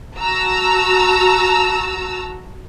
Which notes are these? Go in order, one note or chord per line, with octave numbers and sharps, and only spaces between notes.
F#4 A5 A#5 E6